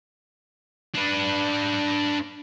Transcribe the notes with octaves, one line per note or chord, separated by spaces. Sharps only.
D4 B4